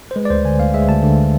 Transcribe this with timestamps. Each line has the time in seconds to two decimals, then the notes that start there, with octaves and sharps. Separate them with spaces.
0.11 C5
0.16 G#3 B4
0.25 D5
0.30 D2 C5
0.45 D3 G#5
0.60 D2 F5
0.74 G#3 E5
0.89 D2 A5
1.03 D3